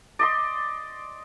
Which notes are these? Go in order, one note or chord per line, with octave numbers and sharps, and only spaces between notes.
D5 D#5 C6